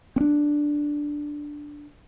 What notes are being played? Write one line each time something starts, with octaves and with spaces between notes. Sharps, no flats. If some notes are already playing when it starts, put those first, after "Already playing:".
C4 D4